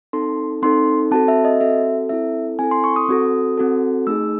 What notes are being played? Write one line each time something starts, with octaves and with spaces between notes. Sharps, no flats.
C4 D#4 A4 C6
C4 D#4 A4 C6
C4 F#4 A4 A5
E5
D#5
C4 F#4 A4 E5
C4 E4 A4 E5
C4 E4 A4 G#5
C6
C#6
D#6
C4 F#4 A4
C4 F#4 A4
A3 D#4 G#4 E6